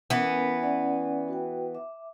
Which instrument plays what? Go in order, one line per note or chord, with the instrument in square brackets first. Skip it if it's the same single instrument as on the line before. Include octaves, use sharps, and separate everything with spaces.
[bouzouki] E3 B3 [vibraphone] C#4 A#4
[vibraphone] C#4 D5 F#5
F#4 B4 G5
E5 D6